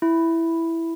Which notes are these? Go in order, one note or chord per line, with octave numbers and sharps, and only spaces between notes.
E4